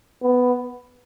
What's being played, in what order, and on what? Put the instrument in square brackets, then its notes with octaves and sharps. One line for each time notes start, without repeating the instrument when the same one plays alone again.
[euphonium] B3